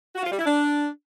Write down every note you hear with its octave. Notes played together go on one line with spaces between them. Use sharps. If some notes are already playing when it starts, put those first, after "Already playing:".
F#4
F4
G3
E4
D4